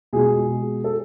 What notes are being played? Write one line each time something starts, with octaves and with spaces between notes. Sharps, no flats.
B2 G#3 G#4
A4